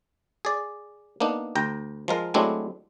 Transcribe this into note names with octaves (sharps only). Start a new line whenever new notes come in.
G#4 D5
A#3 B3 D4 D#4
D2 G5 A#5
F3 G#3 A#4
F#3 G#3 A3 C4 D4 E4